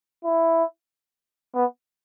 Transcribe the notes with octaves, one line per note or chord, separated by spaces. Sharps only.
E4
B3